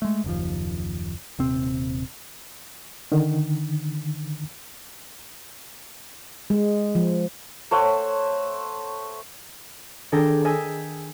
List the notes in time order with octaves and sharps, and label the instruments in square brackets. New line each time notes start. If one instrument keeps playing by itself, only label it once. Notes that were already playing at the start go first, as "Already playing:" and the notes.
[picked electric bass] G#3 A3
F#1 D#2 F3
D#1 C3 C4
[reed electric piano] D3 D#3
[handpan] G#3
F3
[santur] A3 C5 C#5 F#5
[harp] D#3 D4 G#4 A4 G5 A#6
D#5 G5 G#5 E6 B6